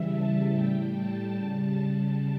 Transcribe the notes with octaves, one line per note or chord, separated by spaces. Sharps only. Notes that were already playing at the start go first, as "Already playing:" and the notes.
Already playing: C#3 E3 G3 E5
A5
A2 G3 G5
A5
C#3 G3